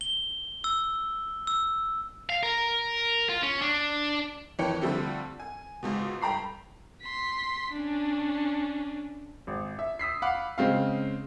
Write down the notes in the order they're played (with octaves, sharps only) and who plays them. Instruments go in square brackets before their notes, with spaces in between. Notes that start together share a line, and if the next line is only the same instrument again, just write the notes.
[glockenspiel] G7
E6
E6
[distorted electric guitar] F5
A#4
F4
C#4
D4
[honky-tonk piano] F2 D#3 E3 C#5 G5 C#7
D3 F3 G3 A3 C4
G#5
C#2 G#2 B2
G2 G5 A#5 B5 C7
[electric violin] C6 B6
C#4 D4
[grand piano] G#1
E5
D#6 E6 B6 C7
F5 F#5 B5 D6
C#3 G#3 C4 F5